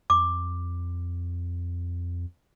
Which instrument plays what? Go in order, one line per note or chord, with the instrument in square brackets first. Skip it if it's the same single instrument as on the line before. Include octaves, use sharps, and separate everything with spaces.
[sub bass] F2 [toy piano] D6